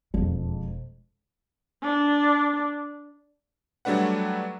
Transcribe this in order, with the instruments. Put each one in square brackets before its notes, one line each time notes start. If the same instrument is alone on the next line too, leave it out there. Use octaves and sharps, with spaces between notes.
[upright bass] E1 G#3 [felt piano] F2
[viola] D4
[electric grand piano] F#3 G3 A3 D4 B4 F#5